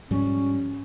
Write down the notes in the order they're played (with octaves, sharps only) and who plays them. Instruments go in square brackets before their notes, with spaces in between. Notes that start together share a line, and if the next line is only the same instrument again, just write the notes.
[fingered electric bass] G#2 F3 G3 [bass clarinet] C#4